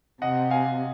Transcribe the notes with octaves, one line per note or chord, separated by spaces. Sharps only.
C3 D#5 F#5
F5 G#5